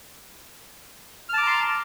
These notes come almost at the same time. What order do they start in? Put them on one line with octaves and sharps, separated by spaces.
F6 A5 D6 A#5 C6